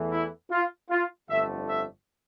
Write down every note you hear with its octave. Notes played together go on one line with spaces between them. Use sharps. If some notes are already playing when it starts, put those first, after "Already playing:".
Already playing: E2 E3 A3
E4
F4
F4
G1 F2 D3 A3 E5
E5